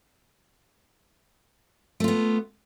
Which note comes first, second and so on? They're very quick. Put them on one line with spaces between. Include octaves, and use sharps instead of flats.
A3 F4 B3